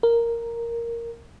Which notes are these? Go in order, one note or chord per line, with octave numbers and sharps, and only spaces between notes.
A#4